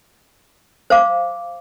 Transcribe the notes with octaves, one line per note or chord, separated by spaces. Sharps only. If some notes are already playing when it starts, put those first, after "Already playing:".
C5 F5 D6